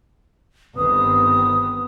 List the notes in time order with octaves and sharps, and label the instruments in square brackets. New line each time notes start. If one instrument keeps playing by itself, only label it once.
[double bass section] G1 D#3 C4 [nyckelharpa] B3 [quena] D#6